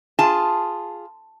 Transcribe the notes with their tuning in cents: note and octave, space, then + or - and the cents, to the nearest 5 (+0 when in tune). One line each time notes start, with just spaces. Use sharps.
F4 +0 G#4 -5 A5 +0